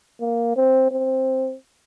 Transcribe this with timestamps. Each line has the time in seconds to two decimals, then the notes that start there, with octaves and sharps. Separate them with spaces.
0.21 A#3
0.56 C4
0.91 C4